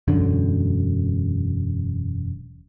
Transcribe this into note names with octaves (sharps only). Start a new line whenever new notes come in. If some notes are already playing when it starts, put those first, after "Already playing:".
E1 F#2 D3